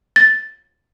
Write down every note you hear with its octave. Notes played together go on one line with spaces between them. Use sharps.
A6